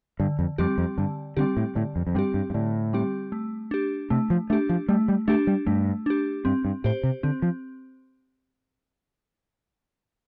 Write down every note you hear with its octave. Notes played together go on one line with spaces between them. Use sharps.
G2 D3
F2
F2 G3 C4 G4
F2
G2 D3
D3 G3 C4 G4
A2
A2 D3
F2
F2
G2 G3 C4 G4
G2
G2
A2 D3
G3 C4 G4
A3
D4 G4
C3 A3
F3
A3 D4 G4
F3
G3 A3
G3
A3 D4 G4
G3
G2 A3
D4 G4
G2 C4
G2
A2 G4 C5
C3
D3 C4
F3